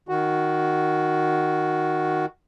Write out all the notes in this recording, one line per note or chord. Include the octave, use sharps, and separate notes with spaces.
D#3 F#4